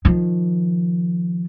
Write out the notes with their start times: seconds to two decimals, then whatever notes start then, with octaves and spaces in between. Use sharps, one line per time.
0.05 D#3 F3